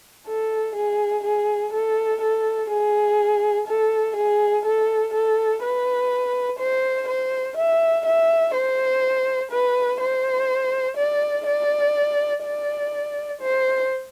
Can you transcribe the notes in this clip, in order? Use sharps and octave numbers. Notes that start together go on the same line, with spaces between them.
A4
G#4
G#4
A4
A4
G#4
A4
G#4
A4
A4
B4
C5
C5
E5
E5
C5
B4
C5
D5
D5
D5
C5